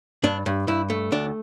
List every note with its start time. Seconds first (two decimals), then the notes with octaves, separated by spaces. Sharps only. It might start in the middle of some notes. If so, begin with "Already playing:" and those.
0.23 G2 D4
0.46 G2
0.68 G2 E4
0.90 A3
1.12 D2 D4